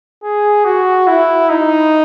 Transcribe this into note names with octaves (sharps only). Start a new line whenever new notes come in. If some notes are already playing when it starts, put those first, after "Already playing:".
G#4
F#4
E4
D#4